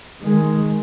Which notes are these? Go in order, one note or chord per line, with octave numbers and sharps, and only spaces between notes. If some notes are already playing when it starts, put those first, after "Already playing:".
D#3 G#3